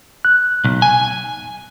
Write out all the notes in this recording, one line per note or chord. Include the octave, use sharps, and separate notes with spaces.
F#6
B1
G#5